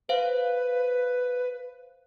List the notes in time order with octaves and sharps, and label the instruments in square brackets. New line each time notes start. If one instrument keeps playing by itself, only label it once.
[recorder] B4 [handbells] C5 F5